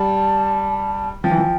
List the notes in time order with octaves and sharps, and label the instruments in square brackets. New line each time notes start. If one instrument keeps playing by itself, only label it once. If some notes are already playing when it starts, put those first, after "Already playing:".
Already playing: [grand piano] G3 [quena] A5
[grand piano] F3 [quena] G5
[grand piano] E3
F3